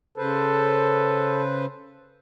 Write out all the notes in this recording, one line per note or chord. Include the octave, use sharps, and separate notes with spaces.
C#3 A4 B4 C5